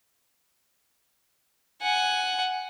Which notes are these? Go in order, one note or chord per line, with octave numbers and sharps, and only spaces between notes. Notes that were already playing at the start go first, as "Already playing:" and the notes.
F#5 G#5